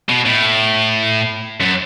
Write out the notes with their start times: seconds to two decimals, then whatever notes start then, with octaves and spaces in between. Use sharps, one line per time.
0.09 B2
0.25 A2
1.60 F#2